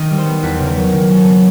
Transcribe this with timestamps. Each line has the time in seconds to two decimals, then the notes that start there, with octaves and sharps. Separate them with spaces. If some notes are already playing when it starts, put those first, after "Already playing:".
Already playing: D#3 D#5
0.11 G3
0.18 C5
0.26 B3
0.43 E2 B4
0.59 C#3
0.67 A#4
0.77 F#3
0.92 D#3
1.10 F#3
1.17 A4
1.26 B3